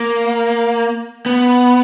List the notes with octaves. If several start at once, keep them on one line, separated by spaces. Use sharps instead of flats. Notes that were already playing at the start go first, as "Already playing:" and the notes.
Already playing: A#3
B3